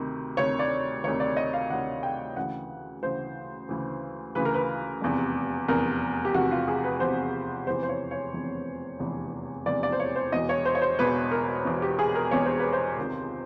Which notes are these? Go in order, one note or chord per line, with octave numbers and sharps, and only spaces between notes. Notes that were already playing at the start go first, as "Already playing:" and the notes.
Already playing: D2 C3 D#3
D2 C3 D#3 C#5
D5
D2 C3 D#3 C#5
D5
D#5
F5
D2 C3 D#3 F#5
G5
D2 C#3 E3 F#5
D2 C#3 E3 C5
D2 C#3 E3
D2 C#3 E3 B4
A#4
B4
F1 E2 C3
F1 E2 C3 A#4
G4
F1 E2 C3 F#4
F4
G#4
B4
F1 E2 C3 C5
F1 E2 C3 E3 C5
C5
C#5
C#5
F1 E2 C3 E3
F1 E2 C3 E3
F1 E2 C3 E3 D5
D5
C5
C#5
C5
E1 E2 B2 D#5
C#5
C5
C#5
C5
E1 E2 B2 B4
A#4
E1 E2 B2
G4
G#4
A#4
E1 E2 B2 C#5
C5
B4
C5
C#2 C3 D#3